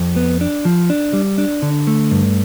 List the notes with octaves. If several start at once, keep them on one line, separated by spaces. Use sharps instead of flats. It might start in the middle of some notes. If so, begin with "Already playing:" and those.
Already playing: F2
B3
D4
F3
D4
G3
D4
D3
A3
G2